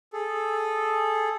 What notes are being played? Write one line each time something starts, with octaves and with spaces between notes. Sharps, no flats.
G#4 A4